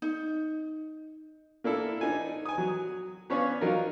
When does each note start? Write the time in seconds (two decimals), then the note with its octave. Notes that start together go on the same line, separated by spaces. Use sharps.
0.02 D#4
1.64 A#3 D4 E4 A4
2.01 D4 D#4 G#5
2.46 G#5 D#6
2.58 F#3
3.30 B3 C#4 D4 C#5 D5 F5
3.61 F#3 D#4 F4 A#4